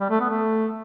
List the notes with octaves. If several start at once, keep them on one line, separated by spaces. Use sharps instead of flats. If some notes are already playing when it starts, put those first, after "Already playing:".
G3
A3
B3
A3